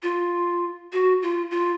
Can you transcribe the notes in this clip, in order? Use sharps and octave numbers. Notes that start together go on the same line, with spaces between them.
F4
F#4
F4
F4